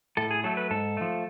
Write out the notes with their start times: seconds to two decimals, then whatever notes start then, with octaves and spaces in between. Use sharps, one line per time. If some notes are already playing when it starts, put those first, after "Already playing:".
0.17 A2 A4
0.31 G#4
0.44 F#3 A3 A4
0.57 B4
0.70 G#2 A4
0.97 F3 A3